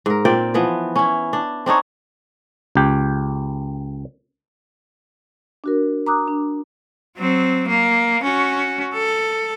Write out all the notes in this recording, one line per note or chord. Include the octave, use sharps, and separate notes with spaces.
G#2 A#4
A#2 C4 D5 G5
E3 F3 B3
C#4 E4
D4
C4 D4 D#4 C#5
C#2 G4
D4 F#4 A#4
A#5 D6 D#6 F#6
D4
F#3 C4
A#3
C#4 F#4
A4